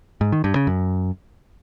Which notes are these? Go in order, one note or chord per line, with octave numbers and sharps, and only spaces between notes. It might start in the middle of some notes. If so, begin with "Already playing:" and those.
G#2
D#3
G2
C#3
F#2